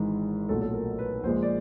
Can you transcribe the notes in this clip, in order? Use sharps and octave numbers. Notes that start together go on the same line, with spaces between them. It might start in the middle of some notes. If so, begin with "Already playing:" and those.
Already playing: G#1 G#2 E3 G#3
B1 A#2 F#3 A3 A4
A4
A#4
B4
A#1 A#2 F3 G#3 C5
D5